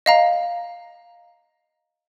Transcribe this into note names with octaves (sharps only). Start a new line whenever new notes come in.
D#5 F5 A#5